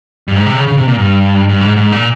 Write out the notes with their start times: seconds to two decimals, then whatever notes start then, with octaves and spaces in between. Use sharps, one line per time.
0.28 G2
0.36 G#2
0.46 C3
0.57 C#3
0.67 C#3
0.77 C3
0.88 A#2
0.98 G2
1.49 G2
1.61 G#2
1.76 G#2
1.92 A#2